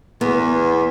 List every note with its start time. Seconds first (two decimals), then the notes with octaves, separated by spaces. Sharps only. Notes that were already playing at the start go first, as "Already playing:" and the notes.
0.21 E2 B3